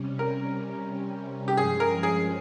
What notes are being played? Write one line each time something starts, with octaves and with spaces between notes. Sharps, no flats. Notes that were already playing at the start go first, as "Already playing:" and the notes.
Already playing: C3 G3 C#4
A#4
G4
G2 F3 G#3 C#4 G#4
A#4
G#4